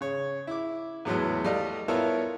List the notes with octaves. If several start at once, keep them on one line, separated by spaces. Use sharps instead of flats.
C#3 C#5
E4 D6
E2 A2 F#3 G#3 B3
G3 A3 D5 D#5 F5
B3 E4 F4 A4 A#4 C#5